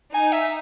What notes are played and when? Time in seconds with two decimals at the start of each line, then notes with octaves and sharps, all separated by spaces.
0.14 D#4 G#5
0.33 E5